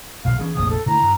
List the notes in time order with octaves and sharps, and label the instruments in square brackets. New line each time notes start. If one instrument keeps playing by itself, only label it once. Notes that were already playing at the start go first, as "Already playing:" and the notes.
[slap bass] B1 A#2 D3 [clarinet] F5
[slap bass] E3 C#4 [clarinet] G#4
[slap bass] F1 A#1 C3 [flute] D#6
[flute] A4
[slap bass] D3 D#3 A3 [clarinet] E4 [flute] A#5
[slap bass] G2